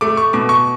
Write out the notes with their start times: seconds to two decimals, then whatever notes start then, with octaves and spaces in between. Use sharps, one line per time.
0.01 A3 D6
0.17 C#6
0.33 B2 D6
0.49 C#6